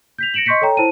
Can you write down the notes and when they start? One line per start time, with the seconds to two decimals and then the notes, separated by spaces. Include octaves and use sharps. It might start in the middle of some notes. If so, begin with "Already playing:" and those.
0.18 G6 B6 F7
0.34 A#6 C#7 D7 E7 F#7
0.46 D#5 C6 C#6 G6 B6 C#7
0.62 A4 C#5 G5 A#5
0.77 E4 C5 A5 D#7